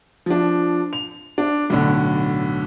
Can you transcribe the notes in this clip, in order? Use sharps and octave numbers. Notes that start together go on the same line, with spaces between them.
F3 D4
F7
D4
B1 A2 D3